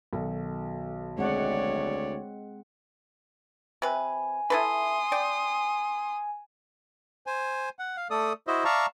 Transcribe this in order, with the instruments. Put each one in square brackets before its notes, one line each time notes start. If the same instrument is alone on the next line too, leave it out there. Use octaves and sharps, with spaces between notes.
[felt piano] B1 D#3 A4
[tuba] D2 [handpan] G#3 C4 F#5 [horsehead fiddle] C#5 D5
[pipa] C3 B4 [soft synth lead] G#5
[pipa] E4 A4 B4 [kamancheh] C6 D#6
[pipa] D5 G5
[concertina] C5 G#5
F#5
F5
A3 A4 D5 D#6
E4 F#4 C5 D#5 E5
D5 E5 F5 A5 A#5 C#6